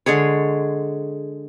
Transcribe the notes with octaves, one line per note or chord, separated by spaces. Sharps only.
D3 G#3 G#4 C#5